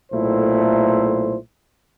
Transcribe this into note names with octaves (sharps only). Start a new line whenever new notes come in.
B1 A#2 A3 E4 A4 C5